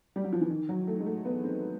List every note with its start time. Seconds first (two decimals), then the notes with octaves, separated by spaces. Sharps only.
0.16 G3
0.24 F#3
0.33 F3
0.41 E3
0.50 D#3
0.69 F#3
0.87 A3
1.00 G#3
1.06 A3
1.25 B3
1.44 C4